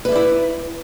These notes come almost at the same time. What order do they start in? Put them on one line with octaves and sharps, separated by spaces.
B4 E5 D5 E4